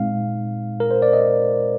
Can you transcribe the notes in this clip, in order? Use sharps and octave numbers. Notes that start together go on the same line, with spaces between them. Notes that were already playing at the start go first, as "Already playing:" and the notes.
Already playing: A#2 G#3 C4 D#4 F5
A#4
C5
D5
D#5